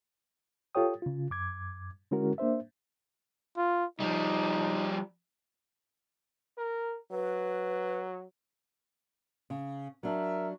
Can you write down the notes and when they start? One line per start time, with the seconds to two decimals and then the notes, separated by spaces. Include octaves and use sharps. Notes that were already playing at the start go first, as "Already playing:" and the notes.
0.75 F4 G4 A4 C#5 G5 D#6
1.02 C#3 F4
1.31 F#2 D6 G#6
2.11 D3 G#3 C#4 E4 F#4 A#4
2.38 A#3 D4 C5 E5
3.57 F4
4.00 F3 G3 D#4
6.58 A#4
7.12 F#3 B4
9.50 C#3
10.03 F#3 D4 A#4 E5